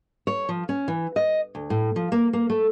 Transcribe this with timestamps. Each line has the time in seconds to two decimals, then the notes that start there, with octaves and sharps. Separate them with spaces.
0.27 C#5
0.49 F3
0.69 C#4
0.88 E3
1.16 D#5
1.55 D2
1.70 A2
1.96 F3
2.12 A#3
2.33 A#3
2.50 A3